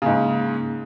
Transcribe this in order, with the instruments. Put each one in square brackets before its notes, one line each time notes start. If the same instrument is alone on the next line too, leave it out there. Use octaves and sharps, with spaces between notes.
[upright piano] G#2 C#3 [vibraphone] A#3